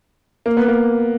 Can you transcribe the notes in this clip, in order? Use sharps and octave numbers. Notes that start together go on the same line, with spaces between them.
A#3
B3
A#3